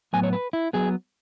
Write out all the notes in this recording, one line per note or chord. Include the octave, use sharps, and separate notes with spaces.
A2 F#3 B3 G#5
C#5
B4
E4
F#3 B3 G#4